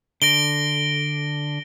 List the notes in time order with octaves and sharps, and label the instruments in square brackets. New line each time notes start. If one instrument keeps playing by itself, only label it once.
[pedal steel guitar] D3 [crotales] A#6 D7 G7